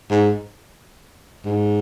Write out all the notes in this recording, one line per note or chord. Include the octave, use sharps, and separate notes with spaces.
G#2
G#2